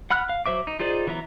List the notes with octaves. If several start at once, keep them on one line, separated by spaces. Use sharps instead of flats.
F#5 B5 F6 F#6
F5
F#3 C5 E5 D6
D#4
D#4 F4 G#4 C5 D5
E3 F#3 B3 E5 A#5